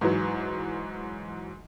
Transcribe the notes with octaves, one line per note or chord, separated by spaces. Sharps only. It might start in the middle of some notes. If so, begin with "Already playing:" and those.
G#2 E3 F#3